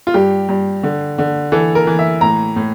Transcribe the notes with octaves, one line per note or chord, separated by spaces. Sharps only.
F4
G2 G4
G2
D3
D3
E3 A4
A#4
E3
E5
A2 A#5
A2